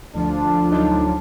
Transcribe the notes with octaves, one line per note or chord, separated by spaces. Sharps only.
D2 D3 F3 D4 F4
F#3 D#4